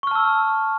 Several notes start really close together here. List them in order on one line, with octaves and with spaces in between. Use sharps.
C#6 F6 A5 E6